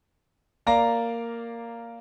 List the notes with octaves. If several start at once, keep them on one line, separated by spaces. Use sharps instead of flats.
A#3 D5 F5 A#5